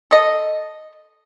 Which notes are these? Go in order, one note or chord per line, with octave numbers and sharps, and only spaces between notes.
A4 D#5